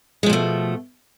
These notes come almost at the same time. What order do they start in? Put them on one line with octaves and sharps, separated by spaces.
G#3 F3 B2 A3